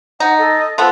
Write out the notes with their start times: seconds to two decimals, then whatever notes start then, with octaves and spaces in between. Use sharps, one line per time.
0.20 D#4 F#5
0.37 A4 D#5
0.78 F3 B3 A4